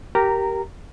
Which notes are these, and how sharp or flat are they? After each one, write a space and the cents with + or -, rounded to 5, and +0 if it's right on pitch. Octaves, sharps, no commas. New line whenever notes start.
G4 -15 A#4 +0 A#5 -15